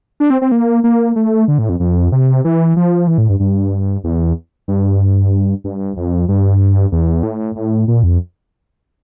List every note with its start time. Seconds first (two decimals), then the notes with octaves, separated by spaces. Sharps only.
0.20 D4
0.30 C4
0.42 C4
0.52 A#3
0.84 A#3
1.16 A3
1.48 D3
1.59 A2
1.69 F2
1.80 F2
2.12 C3
2.45 E3
2.76 F3
3.07 E3
3.18 A2
3.29 G2
3.40 G2
4.04 E2
4.68 G2
5.64 G2
5.96 F2
6.28 G2
6.92 E2
7.23 A2
7.56 A2
7.88 A#2
8.03 F2